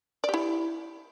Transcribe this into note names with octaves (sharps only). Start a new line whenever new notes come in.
E4 G4 D5